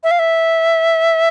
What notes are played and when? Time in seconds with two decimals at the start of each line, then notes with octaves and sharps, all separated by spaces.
0.04 E5
0.11 F5
0.19 E5